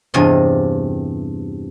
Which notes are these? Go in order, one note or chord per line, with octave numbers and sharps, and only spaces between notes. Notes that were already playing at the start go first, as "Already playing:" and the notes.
E2 G2 C3 F4 C#5 D#5